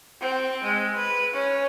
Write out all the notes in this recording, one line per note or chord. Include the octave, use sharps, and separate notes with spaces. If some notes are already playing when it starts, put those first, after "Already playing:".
C4
G#3
B4
C#4